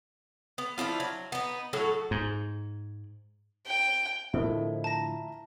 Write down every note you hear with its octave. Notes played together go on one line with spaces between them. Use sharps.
B3
F3 D4 E4 F4
F#3
B3 D#4
A2 F#3 F#4 A4
G#2
G5
A2 D3 F3 E4 A4 A#4 C5 D#5
A5 A#5 A#6